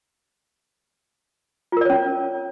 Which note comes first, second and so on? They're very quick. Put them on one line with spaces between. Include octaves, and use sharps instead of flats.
F4 A#4 D5 C#5 C#4